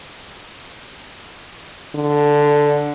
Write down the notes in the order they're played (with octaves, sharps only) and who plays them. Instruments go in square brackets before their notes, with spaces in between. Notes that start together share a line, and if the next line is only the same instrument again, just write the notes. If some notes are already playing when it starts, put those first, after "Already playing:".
[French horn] D3